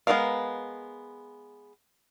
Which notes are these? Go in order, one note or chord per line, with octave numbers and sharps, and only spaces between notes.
G#3 B3 E4 A#4 F5